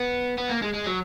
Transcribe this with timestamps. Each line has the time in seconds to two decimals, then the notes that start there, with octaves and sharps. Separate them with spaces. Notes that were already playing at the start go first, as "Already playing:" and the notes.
Already playing: B3
0.38 B3
0.49 A#3
0.62 G#3
0.74 G#3
0.86 F#3